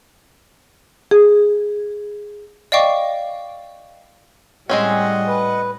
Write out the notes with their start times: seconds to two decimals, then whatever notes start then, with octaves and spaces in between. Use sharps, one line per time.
1.11 G#4
2.72 D5 D#5 F5 G5 C#6 D6
4.70 A2 G3 G#3 C4 C#4 D#5 F#5
5.27 B4